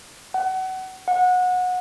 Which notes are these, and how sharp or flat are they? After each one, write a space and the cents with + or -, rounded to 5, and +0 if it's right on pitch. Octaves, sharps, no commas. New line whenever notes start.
F#5 +30
F#5 -25